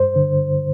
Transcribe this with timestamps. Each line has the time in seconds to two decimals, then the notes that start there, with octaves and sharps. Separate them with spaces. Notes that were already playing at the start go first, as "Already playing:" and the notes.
Already playing: G2 C5
0.16 D3